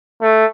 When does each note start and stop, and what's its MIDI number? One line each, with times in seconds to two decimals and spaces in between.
0.22 0.45 57